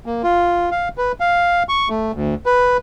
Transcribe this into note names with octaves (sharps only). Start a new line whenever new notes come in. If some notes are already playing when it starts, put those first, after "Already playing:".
A#3
F4
F5
B4
F5
C#6
A3
D2
B4